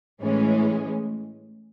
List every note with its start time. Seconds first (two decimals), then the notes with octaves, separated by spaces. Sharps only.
0.21 A2 E3 G#3 C#4